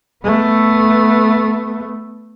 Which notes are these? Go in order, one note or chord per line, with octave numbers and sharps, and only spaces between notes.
A3 B3